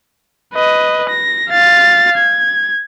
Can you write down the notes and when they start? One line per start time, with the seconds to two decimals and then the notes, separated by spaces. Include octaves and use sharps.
0.54 B4 D#5
1.09 A#6
1.50 F5 A6
2.17 G#6